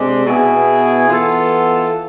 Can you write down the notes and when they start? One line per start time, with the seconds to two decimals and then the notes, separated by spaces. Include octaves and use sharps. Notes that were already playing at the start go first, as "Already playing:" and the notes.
Already playing: C3 G#3 D4
0.25 B2 B3 E4 G#4
1.09 E3 B3 F4 A4